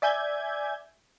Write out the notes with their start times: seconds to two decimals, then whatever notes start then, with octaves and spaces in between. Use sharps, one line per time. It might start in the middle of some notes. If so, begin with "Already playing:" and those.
0.02 D5 E5 G#5 G6 G#6